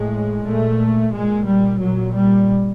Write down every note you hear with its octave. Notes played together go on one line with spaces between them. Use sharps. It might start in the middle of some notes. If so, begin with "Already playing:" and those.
Already playing: A2 G#3
A#2 A3
A#2 G#3
G3
A#2 F#3
G3